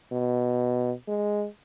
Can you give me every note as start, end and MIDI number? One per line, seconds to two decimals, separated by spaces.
0.12 0.93 47
1.08 1.47 56